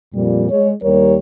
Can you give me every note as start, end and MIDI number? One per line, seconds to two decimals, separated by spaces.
0.13 0.47 41
0.13 0.47 46
0.13 0.47 55
0.50 0.71 56
0.50 0.71 73
0.82 1.16 39
0.82 1.16 55
0.82 1.16 70
0.82 1.16 73